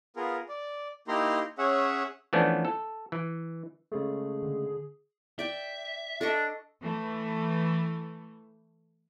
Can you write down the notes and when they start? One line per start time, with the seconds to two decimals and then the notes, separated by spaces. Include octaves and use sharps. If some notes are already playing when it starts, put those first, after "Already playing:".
0.16 B3 F4 G#4 A#4
0.49 D5
1.08 A#3 D#4 E4 G4 A#5 C6
1.58 C#4 G#4 C#5 E5 F#5
2.33 E3 F3 A3 B3 C#4 D4
2.65 A4
3.12 E3
3.92 C#3 G#3 A3 G#4
4.43 D3
5.39 D5 E5 G5
6.21 D4 A4 D#5 C#6
6.82 E3 A3